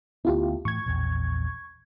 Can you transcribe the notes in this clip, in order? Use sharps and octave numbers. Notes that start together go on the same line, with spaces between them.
D2 B3 E4 F4 G4
A2 E3 C#6 G#6
A#1 E2